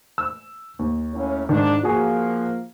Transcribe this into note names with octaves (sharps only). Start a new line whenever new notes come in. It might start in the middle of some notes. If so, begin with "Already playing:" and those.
E6
D#2
A2 A#3 C#4
G#2 D#3 D4
F3 A#3 F#4 G#4